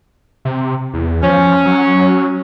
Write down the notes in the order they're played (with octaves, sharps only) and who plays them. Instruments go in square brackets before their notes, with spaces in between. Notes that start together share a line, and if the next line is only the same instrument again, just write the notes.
[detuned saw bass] C3
E2
[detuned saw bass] F3 [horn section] C#4
[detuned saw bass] F#3